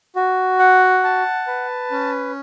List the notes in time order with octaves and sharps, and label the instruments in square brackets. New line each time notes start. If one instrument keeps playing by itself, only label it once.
[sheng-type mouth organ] F#4
F#5
A5
B4
C#4